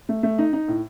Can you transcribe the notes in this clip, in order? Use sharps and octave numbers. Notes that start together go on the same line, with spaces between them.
A3
A3
D#4
D#4
A2